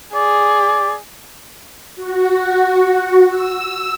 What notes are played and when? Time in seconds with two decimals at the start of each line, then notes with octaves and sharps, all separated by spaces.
0.14 G#4 D5
1.96 F#4
3.29 E6